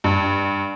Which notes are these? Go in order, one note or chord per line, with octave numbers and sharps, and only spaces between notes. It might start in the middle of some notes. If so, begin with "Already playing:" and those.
G2